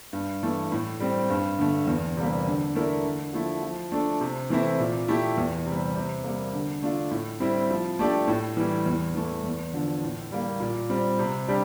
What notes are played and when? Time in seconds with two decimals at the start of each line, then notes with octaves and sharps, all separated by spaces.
0.13 G2
0.43 E3 A3
0.72 A2
1.00 G3 C4
1.30 G2
1.59 D3 A3
1.87 E2
2.17 C3 G3 A#3
2.46 D3
2.75 A3 E4 A#4 D5
3.04 D3
3.33 F3 A3 E4
3.63 F3
3.92 A3 D4 A4
4.21 C3
4.50 E3 A3 C4 E4
4.79 A#2
5.08 A3 E4 G4
5.38 E2
5.66 C3 G3
5.96 C3
6.24 G3 A#3
6.53 D3
6.83 A3 D4 F4
7.11 A2
7.40 G3 C4 E4
7.70 F3
7.99 A3 D4 G4 D5
8.28 A2
8.57 E3 G3
8.86 E2
9.15 E3 A3
9.44 E2
9.73 D3 F3
10.03 A2
10.32 G3 A#3
10.60 A#2
10.90 G3 C4
11.19 C3
11.48 G3 D4 G4